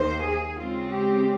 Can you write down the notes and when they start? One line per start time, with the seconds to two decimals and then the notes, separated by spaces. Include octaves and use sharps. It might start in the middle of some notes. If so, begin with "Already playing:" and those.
Already playing: D#2 D#3 A#3 C5
0.24 G#4
0.58 C#3 G#3 C4 F4
0.91 G4